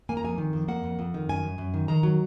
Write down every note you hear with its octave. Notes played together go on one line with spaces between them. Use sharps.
A#3 G#5
A#5
F2 G#5
D#3
F2
A#3 F#5
F2
F2
D#3
F#2 G#5
F#2
F#2
D#3
D#3 A#5
F#3